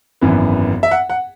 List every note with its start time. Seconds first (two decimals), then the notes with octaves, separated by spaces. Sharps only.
0.21 G#1 F#2 E3 B3
0.83 E5
0.91 F#5
1.10 F#5